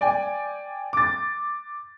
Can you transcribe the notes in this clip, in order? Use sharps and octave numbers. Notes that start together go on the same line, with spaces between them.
D5 G5 G#5
D6 A6